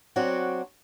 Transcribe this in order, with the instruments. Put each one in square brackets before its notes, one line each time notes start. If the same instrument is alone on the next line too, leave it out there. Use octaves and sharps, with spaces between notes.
[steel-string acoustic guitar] F#3 C4 D4 F#4